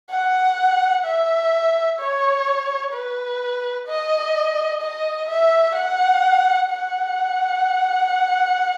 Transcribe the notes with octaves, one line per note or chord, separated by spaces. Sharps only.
F#5
E5
C#5
B4
D#5
D#5
E5
F#5
F#5